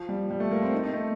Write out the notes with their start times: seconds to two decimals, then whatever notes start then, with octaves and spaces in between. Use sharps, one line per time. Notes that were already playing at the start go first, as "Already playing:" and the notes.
Already playing: F3
0.09 G3
0.30 G3
0.40 A3
0.51 A#3
0.62 C4
0.73 D#4
0.83 D#4
0.94 A3